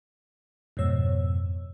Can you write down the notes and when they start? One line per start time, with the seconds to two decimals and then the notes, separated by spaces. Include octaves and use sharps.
0.77 F2 G#2 B2 C#5 E6